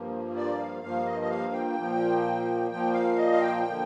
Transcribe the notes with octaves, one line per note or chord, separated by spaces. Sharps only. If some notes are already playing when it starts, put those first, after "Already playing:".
Already playing: G2 F3 A#3
D5
F5
G2 F3 A#3 F5
D#5
D#5
F5
G5
A#2 F3 A#3
A#2 F3 A#3 G5
F5
D#5
F5
G5
D3 F3 A#3